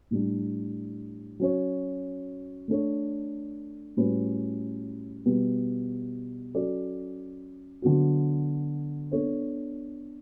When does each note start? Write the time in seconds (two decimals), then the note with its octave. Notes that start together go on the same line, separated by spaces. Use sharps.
0.11 A2 G3 D4
1.40 F#3 C#4 F#4 C#5
2.68 A3 D4 A4 C#5
3.97 A2 G3 C#4 F#4 B4
5.25 B2 G3 B3
6.54 F#3 C#4 F#4 A4 D5
7.82 D3 F#3 B3 F#4
9.12 B3 D4 A4 C#5